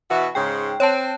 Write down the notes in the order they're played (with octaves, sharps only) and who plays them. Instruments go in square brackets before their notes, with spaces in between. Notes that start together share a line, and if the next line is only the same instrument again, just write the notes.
[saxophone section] B2 E3 F#4
[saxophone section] G#2 C#3 [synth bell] G5
[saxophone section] C4 [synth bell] C#5 A5